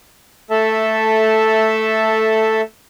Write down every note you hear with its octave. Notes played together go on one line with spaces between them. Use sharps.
A3 A4 E5 A5